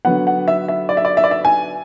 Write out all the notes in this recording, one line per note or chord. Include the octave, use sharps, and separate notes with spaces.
D3 F#3 B3 F#5
F#5
E5
E5
D5
E5
D5
E5
D5
E5
G#5